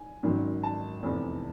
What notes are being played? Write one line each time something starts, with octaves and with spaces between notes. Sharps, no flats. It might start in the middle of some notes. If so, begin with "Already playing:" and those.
Already playing: G#5
G#1 F#2 D#3 F#3
A5
F1 E2 C3